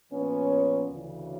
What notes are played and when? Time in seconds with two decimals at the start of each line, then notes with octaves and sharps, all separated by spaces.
0.12 A#2 F3 B3 C#4
0.90 D2 C#3 E3